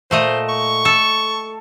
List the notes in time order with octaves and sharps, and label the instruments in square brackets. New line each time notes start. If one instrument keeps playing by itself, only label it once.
[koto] A#2 A3 D#5 [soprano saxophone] C5
[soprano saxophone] C#6
[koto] A4